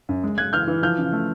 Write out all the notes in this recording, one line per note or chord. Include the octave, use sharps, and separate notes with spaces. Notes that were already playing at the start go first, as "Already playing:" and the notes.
F#2
G#3
G#3 F#6 G#6
E3 F6 G6
E3
F3 F6 G6
C#3
A3